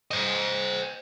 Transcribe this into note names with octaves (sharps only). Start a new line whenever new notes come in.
C5 D#5